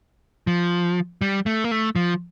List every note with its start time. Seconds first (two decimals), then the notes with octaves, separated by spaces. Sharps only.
0.47 F3
1.22 G3
1.46 A3
1.64 A#3
1.71 A3
1.96 F3